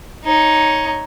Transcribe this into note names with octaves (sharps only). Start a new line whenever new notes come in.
D#4 C#5